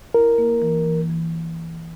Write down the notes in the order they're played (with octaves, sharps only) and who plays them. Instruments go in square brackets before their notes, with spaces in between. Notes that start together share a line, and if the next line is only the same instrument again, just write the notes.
[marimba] E4 [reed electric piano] A#4
[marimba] A#3
E3
E3
E3